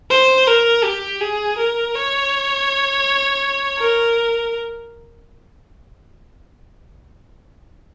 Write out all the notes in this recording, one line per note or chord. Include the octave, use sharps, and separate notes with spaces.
C5
A#4
G4
G#4
A#4
C#5
A#4